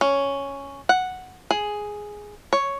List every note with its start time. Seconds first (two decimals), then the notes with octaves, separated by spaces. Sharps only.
0.01 C#4
0.89 F#5
1.51 G#4
2.53 C#5